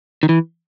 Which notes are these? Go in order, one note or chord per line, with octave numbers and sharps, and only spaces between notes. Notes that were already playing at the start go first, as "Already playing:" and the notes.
D#3
E3